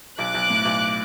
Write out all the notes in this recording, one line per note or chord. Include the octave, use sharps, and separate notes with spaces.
B1 D6 F#6
B1
A2
B1